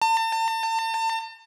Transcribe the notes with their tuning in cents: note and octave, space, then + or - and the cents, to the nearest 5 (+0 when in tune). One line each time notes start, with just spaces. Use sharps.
A5 +40